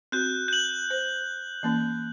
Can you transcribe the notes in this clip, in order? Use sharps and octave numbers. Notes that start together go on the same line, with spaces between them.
C4 F#4 F#6 G6
G6 F#7
C5
E3 A#3 C#4